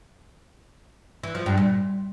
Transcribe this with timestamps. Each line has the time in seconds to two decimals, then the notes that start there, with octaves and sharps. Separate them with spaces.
1.23 E3
1.35 F3
1.46 G2
1.57 A#2